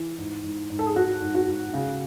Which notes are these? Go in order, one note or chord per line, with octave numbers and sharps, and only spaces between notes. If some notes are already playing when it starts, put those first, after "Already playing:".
Already playing: E3
G#2
G#2
G#2
A4
G#4
G#2 F#4
G#2
F#4
G#2
C#3